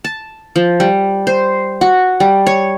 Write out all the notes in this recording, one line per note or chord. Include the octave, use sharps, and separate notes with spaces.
A5
F3
G3
C5
F#4
G3
C#5